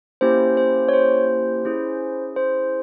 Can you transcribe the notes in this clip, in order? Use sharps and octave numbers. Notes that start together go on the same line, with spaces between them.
A#3 C#4 E4 G4 C5
C5
C#5
C5
C#4 E4 G#4
C5